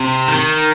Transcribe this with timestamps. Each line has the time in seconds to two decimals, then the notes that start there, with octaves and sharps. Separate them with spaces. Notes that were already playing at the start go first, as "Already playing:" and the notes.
Already playing: C3
0.28 D#3